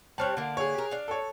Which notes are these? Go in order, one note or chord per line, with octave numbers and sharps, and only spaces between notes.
G3 C4 C#5 A5 F6 F#6
D3 A#3
G#4 C#5
G4 A#4
D4 F5
A4 C#5